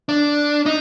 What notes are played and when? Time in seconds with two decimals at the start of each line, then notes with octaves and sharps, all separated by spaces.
0.09 D4
0.66 D#4